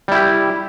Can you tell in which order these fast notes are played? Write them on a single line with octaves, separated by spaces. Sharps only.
G3 E4 G4